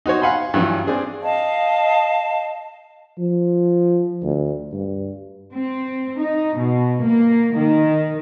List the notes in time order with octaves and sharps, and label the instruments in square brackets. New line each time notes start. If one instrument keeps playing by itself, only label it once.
[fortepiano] D#4 F#4 C5 C#5
F5 F#5 G#5 B5 C6
G2 E3 F#3 C#4 F4
C4 D4 G#4
[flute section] D#5 F5 A5
[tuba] F3
D2
G2
[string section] C4
D#4
B2
A#3
D#3